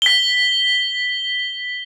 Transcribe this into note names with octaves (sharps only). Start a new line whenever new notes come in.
B6 G7